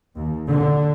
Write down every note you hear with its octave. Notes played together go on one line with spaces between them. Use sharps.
D#2
D3